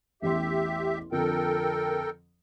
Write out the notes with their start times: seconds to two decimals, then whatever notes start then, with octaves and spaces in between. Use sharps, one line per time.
0.22 A1 E2 G4 E5 C6
1.12 F2 D3 F3 A4 A#4 G5